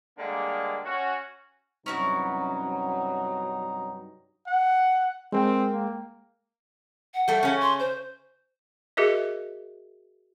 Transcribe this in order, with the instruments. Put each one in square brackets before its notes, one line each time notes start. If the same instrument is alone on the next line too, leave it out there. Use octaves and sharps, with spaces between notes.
[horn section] D3 G3 G#3 A#3
C#4 F#4
[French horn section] G2 C3 F#3 [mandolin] C#4 E4 F#4 [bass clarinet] D#4
[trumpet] F#5
[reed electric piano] G#3 A#4 G5 [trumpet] C4
[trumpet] A#3
[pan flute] F#5
[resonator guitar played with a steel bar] G3 A3
C#3 C#4
[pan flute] C6
C5
[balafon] F#4 G#4 A#4 D#5 E5